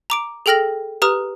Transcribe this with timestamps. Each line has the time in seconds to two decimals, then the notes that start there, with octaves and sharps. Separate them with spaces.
0.10 A#5 D6 D7
0.46 G#4 A4 G5 F6 A#6 F#7
1.02 G4 B4 A#5 D#6 F6